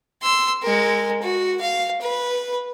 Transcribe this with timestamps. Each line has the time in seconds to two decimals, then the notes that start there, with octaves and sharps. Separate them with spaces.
0.23 C6 E6
0.63 G#3 A#4
1.22 F#4
1.61 F5
2.02 B4